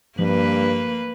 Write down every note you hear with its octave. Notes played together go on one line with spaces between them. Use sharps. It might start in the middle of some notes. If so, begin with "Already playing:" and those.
G2 F3 A#3 B4